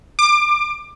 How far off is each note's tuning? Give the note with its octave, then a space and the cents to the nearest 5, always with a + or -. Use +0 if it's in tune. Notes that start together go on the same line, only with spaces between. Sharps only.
D6 +25